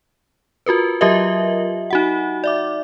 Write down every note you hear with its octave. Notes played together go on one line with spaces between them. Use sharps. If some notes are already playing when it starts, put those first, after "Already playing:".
F4 F#4 A#4 B4
F#3 F4 G4 A#4 D#5 E5
D#4 F#4 F#5
D5 E5 D6